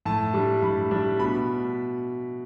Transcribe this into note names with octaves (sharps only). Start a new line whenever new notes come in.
A2 A5
G3 D4
A2 B5
G3 D4
B2 B5